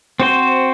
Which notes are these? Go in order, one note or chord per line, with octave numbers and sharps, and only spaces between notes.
C4 F#4 C5